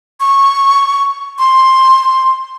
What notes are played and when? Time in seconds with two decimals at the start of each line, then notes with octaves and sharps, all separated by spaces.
0.20 C#6
1.39 C6